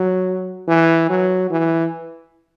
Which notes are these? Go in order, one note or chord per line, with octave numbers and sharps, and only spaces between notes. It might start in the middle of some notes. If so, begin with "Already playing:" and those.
Already playing: F#3
E3
F#3
E3